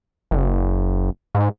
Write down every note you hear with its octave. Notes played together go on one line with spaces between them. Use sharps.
F#1
G#2